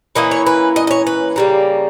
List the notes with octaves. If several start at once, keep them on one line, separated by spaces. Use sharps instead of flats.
E3 A#3 C#4 E4 D#5
C#5
B4
D#5
D#5
C#5
B4
C#3 G3 A#3